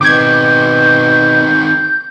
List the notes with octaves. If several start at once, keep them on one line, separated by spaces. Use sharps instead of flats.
B2 D#3 C4 D6 G6 G#6